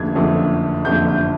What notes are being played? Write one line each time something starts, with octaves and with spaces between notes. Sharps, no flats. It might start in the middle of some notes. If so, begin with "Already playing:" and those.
Already playing: F#1 F2 D3 F3 A3 G#6
F#1 F2 D3 F3 A3
F#1 F2 D3 F3 A3 G6
G6